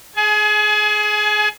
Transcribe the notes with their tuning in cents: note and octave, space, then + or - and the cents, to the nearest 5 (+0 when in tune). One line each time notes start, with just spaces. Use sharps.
G#4 +20 G#5 +35